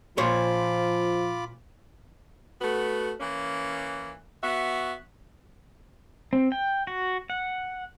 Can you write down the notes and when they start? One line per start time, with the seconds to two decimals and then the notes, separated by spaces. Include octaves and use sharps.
0.18 A#2 F3 F4 C5 C#5 B5 D6
2.61 A3 B3 F#4
3.20 E3 A#3 C#4
4.44 B3 F#4 E5
6.33 C4
6.52 G5
6.87 F#4
7.30 F#5